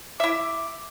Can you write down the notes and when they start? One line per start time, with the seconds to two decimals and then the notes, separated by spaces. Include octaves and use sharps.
0.20 E4 E5 D6